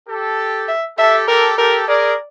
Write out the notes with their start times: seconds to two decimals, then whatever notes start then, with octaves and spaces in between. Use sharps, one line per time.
0.09 G4 A4
0.68 E5
0.98 G4 A4 E5
1.28 G4 A4 A#4
1.58 G4 A4 A#4
1.88 G#4 A#4 D5